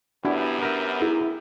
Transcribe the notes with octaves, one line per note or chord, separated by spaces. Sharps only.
F#2 B3 D4 E4 F#4 G4
A#4 E5
E4 G#4